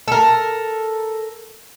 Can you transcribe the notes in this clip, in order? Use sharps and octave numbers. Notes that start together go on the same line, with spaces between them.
A4 A#4